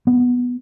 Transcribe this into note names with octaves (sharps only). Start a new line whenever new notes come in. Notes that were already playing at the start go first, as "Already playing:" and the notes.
B3